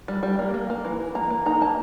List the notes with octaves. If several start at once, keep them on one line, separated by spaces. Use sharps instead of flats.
G3
G3
A#3
A#3
A#3
E3
E3
A#3 A#5
A#3
D#4 A#5
A#3 A5